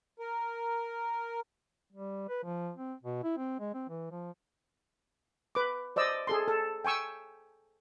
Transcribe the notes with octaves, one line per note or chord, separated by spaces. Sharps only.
A#4
G3
B4
F3
C4
B2
E4
C4
G#3
C4
E3
F3
B4 D6
C5 D5 D#5 E6
G#4 A4 C6
A4
G5 G#5 C#6 E6